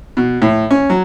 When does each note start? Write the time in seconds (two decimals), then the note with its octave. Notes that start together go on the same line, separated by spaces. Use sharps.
0.17 B2
0.42 A2
0.71 C#4
0.90 F#3